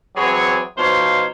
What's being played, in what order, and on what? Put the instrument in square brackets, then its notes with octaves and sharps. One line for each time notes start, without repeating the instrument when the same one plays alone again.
[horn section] E3 F#3 C4 G#4 C#5
B2 F3 D#4 C5 C#5 F5